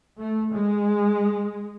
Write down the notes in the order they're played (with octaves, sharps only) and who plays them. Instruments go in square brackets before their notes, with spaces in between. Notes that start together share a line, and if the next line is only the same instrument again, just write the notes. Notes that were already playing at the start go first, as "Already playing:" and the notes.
[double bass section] A3
G#3